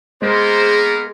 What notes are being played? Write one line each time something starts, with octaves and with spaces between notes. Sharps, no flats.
G#3 A#3 B3 G#4 A#4 C5